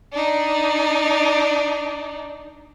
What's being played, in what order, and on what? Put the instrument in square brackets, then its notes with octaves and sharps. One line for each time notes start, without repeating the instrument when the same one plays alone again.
[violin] D4 D#4